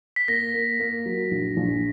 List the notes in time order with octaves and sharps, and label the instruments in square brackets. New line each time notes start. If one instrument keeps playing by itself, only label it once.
[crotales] B6
[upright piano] A#3 [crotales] A#6
[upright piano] A#3
A#3
F#3
A#1
A#1